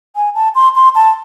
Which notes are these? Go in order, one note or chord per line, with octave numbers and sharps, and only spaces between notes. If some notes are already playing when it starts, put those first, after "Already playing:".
G#5
A5
C6
C6
A5